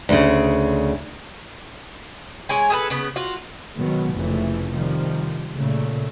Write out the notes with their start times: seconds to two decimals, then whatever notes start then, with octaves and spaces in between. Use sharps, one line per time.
0.09 D2 C#3
2.49 G#3 C#5 G#5
2.70 G#4 A4 B4
2.90 C#3 B3
3.16 F4 F#4
3.76 B2 D#3 F#3 G#3 B3
4.14 F1 F2 C#3 E3 A3
4.72 C3 D#3 F3 G3
5.55 A#2 C#3 A3